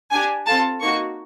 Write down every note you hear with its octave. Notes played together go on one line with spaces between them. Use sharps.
D4 G4 G#5
C4 F4 A4 A5
A#3 D#4 F#4 C#6